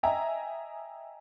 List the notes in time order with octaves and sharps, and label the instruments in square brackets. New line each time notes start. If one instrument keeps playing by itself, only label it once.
[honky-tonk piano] D#5 E5 G5 G#5 A#5